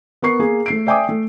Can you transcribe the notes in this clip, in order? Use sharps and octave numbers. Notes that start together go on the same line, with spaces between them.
B3 A#4 C#6 C7
A#3 G#4
A3 C7 D7
D5 E5 G5 G#5 D6 D#6
A3